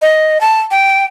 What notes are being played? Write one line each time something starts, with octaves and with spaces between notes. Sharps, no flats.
D#5
A5
G5